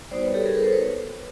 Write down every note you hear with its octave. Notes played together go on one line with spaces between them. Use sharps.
G3 B3 D#4 F#4 C5 D5
B4 C#5
G4 A4
G#4 A#4
A4 B4
A#4 C5
B4 C#5